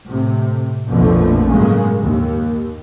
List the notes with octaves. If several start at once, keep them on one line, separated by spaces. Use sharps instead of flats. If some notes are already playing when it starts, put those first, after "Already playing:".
A2 C3
A#1 F2 B2 D3 F3 A3
G1 A2 C#3 F#3 G#3 A#3
D#2